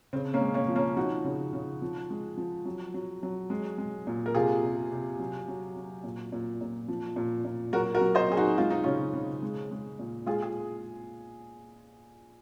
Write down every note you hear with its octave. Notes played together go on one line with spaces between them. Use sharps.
C#3 C4
A#3 C#4
G#3
A#3 C#4
F3
A#3 C#4
F3 D#4 F#4
C#3
C#3
F3
G#3
F3
F#3
F#3
F#3
G#3
G#3
A#2
A#4
C3 F4 G#4
C3
C3
F#3
F#3
F#3
A#2
A#2
A#2
F3
A#2
A#2
F#3 F#4 A#4
F#4 A#4
F#3
C5 D#5
F#3 G#4
D#4 F#4
G#3 F4
D#4
C#3 C#4 F4
C#3
G#3
G#3
A#2
G#3 F4 G#4
G#4